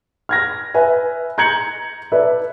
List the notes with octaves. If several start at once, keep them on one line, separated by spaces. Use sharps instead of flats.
F6 G#6 A#6
B4 E5 G#5
A#5 G6 G#6 C#7 F#7
A4 B4 D5 E5